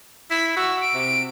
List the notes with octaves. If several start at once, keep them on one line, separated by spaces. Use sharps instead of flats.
E4 B6
F#4 E6
D7
C3